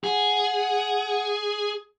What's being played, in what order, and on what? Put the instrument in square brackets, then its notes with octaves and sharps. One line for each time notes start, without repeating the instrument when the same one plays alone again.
[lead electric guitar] G#4 [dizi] F#5